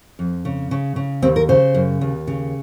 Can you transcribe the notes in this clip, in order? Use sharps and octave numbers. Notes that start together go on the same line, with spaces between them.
F2
C#3
C#3
C#3
D#2 C4
A#4
C#3 C5
F#2
D#2
C#3